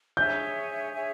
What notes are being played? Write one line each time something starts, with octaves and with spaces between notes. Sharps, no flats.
G#4 C#5 E5 G#5 G6
G#4 C#5 E5 G#5